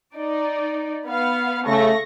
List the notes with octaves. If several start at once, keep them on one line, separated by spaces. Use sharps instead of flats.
D#4 D5
B3 F5
C#3 A3 C#6 A#6